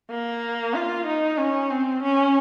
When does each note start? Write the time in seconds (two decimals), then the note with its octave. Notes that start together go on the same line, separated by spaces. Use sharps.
0.10 A#3
0.74 F4
1.06 D#4
1.38 C#4
1.70 C4
2.03 C#4